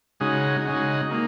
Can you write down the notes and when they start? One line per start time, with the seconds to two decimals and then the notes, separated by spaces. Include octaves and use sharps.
0.20 C#3 G#3 D#4 F#4
0.65 C#3 G#3 D#4 F#4
1.10 A#3 D#4